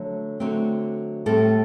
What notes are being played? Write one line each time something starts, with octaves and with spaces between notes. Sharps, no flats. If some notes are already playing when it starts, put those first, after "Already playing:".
Already playing: D3 F#3 A3
D3 F#3 A3 C4
A2 G3 C4 A4